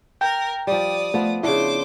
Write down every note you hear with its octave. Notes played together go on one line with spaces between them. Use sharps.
A#4 G5
F3 G3 D5 D#6
F3 A3 B3
C#3 D4 E4 C5 D6